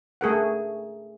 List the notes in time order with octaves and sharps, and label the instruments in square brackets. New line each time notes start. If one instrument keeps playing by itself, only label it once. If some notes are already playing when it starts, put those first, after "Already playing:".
[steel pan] A3 G#4 A#4 F#5